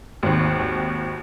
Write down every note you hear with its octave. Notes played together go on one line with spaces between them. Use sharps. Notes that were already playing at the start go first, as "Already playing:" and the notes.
G#1 D#2